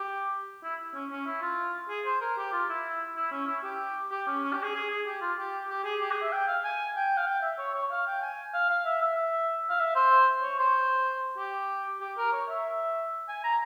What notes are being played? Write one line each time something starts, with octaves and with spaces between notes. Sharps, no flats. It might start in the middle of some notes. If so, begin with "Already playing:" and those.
Already playing: G4
E4
C#4
C#4
E4
F4
G#4
C5
A#4
G4
F4
E4
E4
C#4
E4
G4
G4
C#4
C#4
G4
G#4
G#4
G#4
G4
F4
G4
G4
G#4
G4
G#4
E5
G5
F5
G#5
G5
F5
G5
E5
C#5
C#5
F5
G5
G#5
F5
F5
E5
E5
F5
E5
C5
C#5
C5
G4
G4
A#4
C#5
E5
G#5
A#5